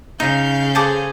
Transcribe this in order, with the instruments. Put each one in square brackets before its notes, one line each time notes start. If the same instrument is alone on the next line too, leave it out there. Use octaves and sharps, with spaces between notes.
[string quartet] C#3 F5 G6 [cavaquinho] D#4
[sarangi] G#4 [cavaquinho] A4 C5 D6